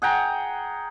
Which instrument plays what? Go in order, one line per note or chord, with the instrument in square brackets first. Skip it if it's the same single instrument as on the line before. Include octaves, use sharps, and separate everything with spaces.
[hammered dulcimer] G#4 F#5 G5 A#5